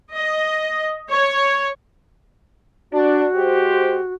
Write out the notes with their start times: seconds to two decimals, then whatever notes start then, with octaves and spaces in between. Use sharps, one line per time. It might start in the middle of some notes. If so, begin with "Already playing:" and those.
0.15 D#5
1.10 C#5
2.93 D4 F#4
3.35 G#3 G4 C5